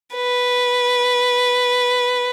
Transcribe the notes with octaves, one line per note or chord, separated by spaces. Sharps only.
B4